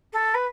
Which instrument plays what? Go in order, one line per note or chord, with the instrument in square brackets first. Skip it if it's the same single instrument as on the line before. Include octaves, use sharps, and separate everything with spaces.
[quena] A4
B4